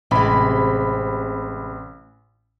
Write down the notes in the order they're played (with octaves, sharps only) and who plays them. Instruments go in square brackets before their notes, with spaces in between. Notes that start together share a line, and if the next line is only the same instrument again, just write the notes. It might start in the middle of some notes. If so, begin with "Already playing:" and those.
[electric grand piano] A1 B5 [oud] C3 G#3